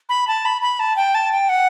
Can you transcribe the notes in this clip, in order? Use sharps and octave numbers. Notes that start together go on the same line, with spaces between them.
B5
A5
B5
B5
A5
G5
A5
G5
F#5